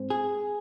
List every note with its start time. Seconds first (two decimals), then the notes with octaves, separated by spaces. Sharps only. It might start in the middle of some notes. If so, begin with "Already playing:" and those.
Already playing: G#2 C4
0.10 G#4